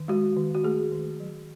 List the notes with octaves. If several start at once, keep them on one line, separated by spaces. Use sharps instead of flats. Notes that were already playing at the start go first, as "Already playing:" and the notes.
Already playing: D#3
G#3 F#4
D#3
F#4
A3 G#4
D#3
F#3